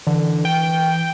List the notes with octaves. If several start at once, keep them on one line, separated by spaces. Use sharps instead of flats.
D3 E3
G5